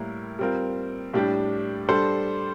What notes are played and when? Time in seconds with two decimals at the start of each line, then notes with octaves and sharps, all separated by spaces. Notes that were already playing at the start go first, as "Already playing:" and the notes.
Already playing: A2 G3 A#3 E4 A#4
0.39 G3 C4 F4 A#4
1.13 A2 G3 D4 G4
1.89 G3 D4 A4 C5